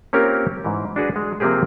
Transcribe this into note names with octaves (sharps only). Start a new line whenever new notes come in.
A#3 C4 C#4 F4 G4 A#4
G#2 E3
D4 F#4 G#4 B4
G#3
C3 F3 A#3 C4 G4 G#4